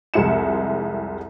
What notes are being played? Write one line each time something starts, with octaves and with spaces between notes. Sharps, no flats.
C2 F2 G#3 E4 C#7 E7